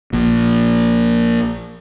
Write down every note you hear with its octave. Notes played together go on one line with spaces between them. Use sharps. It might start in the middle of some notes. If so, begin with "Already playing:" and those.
A#1 A#2